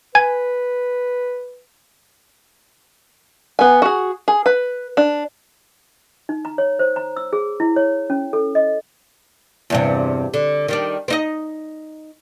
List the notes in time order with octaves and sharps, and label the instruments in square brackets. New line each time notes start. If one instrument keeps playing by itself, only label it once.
[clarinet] B4 [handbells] G#5 G#6
[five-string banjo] B3 G#5
F#4 G#4
G#4
B4
D4
[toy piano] D#4
A#5
C#5
C5
A#5
E6
G#4
E4
C#5
C#4
A4
D#5
[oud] E2 G2 C3
D3
D#3 G3 D4
C4 D#4 D#5